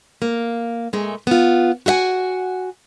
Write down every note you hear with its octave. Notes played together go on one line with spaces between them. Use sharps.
A#3
A#2 G#3 A3
B3 F4
F#4 G4 E5 F#5 G#5